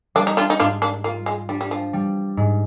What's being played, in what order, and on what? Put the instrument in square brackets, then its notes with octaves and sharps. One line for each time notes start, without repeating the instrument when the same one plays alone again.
[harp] G3 [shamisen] A#3 D4
[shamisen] D#4
D4 F4
D#4
[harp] G#2 [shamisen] D4 F4
[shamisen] A#3 D4
[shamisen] A#3 [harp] F4
[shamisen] G#3
[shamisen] G3 [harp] D4
[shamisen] G3
F3
[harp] G3
G#2